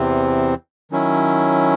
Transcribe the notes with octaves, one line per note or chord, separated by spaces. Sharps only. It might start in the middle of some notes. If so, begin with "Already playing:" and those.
Already playing: E2 C3 E3 C4
D#3 F#3 C#4 E4